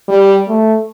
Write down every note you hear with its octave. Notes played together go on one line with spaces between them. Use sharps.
G3
A3